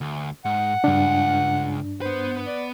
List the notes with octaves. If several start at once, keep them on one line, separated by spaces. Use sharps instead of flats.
D2
G#2 F#5
C#2 G2 D4
B3 B4 C5
D5